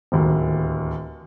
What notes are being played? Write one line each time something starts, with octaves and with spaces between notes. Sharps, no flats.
D1 D#2